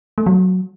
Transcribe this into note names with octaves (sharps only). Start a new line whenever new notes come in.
A3
F#3